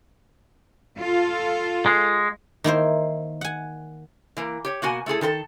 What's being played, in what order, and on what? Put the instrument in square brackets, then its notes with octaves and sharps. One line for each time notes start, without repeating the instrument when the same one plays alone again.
[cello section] F4 A4
[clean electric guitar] G#3
[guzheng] D#3 A#3 E4 C5
F#5 G#5
[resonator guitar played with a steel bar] E3 A#3
G4 C#5
B2 A#3 F#4 G#5
A3 E4 G#4 A4
D#3 A4 A#4 A5